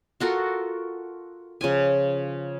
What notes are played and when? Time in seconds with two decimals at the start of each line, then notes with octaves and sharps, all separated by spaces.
0.20 F4 F#4 A4 A#4
1.61 C#3 F3 G#5